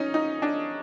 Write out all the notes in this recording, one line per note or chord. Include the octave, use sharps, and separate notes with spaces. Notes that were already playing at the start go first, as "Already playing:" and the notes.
Already playing: C#4 D#4
D#4
D4